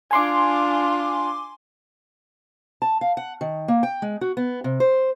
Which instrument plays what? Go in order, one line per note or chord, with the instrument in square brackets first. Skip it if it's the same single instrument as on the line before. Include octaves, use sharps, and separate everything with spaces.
[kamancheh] D4 F4 [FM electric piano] G#5 C6 D6
[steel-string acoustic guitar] A5
F5
F#5
D#3
A#3
G5
G#3
F#4
B3
C3
C5